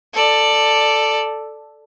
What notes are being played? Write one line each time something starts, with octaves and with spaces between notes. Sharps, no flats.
A4 D5